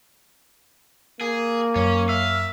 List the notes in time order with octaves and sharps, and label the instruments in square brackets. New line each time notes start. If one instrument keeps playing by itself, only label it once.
[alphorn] A#3 [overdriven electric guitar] G#4
[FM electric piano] F#2 F#3 [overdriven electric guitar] C#4
[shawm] E5 [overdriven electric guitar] F5